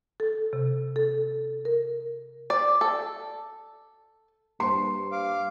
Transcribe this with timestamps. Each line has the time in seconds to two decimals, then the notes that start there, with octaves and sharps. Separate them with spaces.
0.20 A4
0.53 C3
0.96 A4
1.65 A#4
2.50 D5
2.81 A4
4.60 G2 A#3 C5 C6
5.12 F5 D6